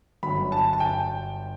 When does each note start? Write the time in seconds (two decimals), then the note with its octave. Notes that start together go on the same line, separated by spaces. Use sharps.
0.23 G1 G2 F#3 B5
0.52 A5
0.73 A5
0.80 G5